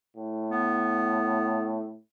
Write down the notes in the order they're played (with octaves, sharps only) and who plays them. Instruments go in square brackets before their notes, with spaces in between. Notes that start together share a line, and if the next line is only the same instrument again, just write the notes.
[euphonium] A2
[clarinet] B3